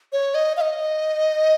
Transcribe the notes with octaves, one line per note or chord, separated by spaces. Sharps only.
C#5
D#5
F5
D#5